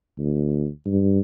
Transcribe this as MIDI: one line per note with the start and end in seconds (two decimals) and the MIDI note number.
0.19 0.68 38
0.86 1.20 43